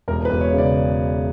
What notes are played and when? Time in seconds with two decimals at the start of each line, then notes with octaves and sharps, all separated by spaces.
0.08 E1 A#4
0.25 B4
0.30 E1
0.41 C#5
0.53 C#3
0.58 D5